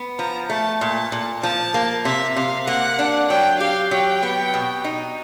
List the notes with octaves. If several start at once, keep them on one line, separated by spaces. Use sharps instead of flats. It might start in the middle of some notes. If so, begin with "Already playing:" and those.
Already playing: B3
F3 A#5
A3 A5
A#2 A5
A#2
F3 A5
A#3
C3 E5
C3 F5
A#3 F#5
D4
F#3 G5
G4 F5
F#3 G5
B3
B2
D#4